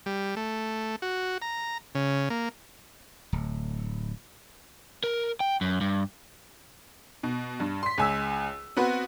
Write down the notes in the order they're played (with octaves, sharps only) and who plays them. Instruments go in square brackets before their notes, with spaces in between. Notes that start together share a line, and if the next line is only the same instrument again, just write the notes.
[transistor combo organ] G3
A3
F#4
A#5
C#3
A#3
[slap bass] D1
[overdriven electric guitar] A#4
G5
F#2
G2
[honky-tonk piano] B2
G2
C6 B6
C#2 G#5 E6
B3 C4 F#4 B4